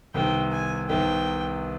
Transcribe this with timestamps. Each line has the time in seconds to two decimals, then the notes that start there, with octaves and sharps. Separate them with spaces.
0.14 C2 C3 D#3 B3 G5
0.52 G#5
0.89 C2 C3 D#3 B3 G5